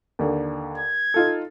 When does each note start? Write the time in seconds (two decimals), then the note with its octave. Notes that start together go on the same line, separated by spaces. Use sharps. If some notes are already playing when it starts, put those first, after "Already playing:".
0.19 D#2 D3
0.78 G#6
1.14 D#4 F4 A4